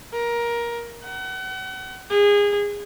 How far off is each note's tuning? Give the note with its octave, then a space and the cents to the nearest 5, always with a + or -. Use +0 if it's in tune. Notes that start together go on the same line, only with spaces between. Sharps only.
A#4 +15
F#5 +35
G#4 -25